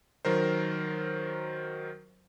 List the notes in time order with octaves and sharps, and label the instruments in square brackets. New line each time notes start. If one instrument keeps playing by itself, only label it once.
[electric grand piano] D#3 F#3 A#4 C5